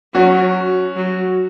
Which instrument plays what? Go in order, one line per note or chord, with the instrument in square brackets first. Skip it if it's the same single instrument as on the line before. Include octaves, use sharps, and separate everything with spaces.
[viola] F#3 [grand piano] C#4 F#4
[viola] F#3